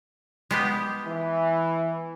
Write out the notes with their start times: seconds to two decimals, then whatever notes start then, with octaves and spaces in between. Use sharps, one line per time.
0.51 G#3 B3 G4
1.07 E3